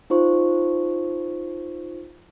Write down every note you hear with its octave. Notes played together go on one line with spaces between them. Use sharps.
D#4 F4 C5 C#6